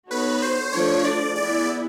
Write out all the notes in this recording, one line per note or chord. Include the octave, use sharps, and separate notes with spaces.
B3 D#4 F#4 A4 B4 C#5
C5
F3 A3 D4 C#5
D5
B3 E4 G#4 D5